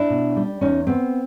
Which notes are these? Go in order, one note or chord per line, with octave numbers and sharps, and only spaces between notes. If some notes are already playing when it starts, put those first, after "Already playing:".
Already playing: D4 E4
B2
G3
E2 C#4 D#4
B3 C4